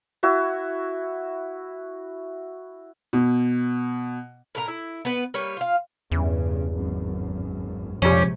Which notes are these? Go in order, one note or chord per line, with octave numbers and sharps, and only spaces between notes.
E4 F#4 E5
B2
A2 A#4 A#5
E4
B3 B4
G3 A#3 B4 C#5
F4 F5
E2 G2 C#3
G#1 F#2
A#1 F2 C3 F3 G3 G#3 C#4 G4